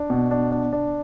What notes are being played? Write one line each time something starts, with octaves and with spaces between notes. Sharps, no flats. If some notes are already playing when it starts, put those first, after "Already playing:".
Already playing: D4
B2
D4
D4
D4